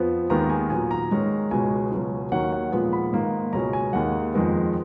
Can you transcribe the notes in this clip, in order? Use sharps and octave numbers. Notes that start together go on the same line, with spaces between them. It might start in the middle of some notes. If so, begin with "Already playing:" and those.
Already playing: F2 F3 B3
D#2 D#3 G#3 B3 A#5
G#5
A#2 F#3 B3 G#5
A#5
G#2 D#3 G#3 C#4
C#2 B2 G#3 C#4 G#5
C#2 B2 F#3 C#4
D#2 D#3 F#3 C#4 F#5
F#5
A#2 F3 G#3 B3
B5
G#2 D#3 A#3
C#2 B2 G#3 C#4 A#5
G#5
D#2 D#3 G#3 F#5
F2 D#3 G#3 B3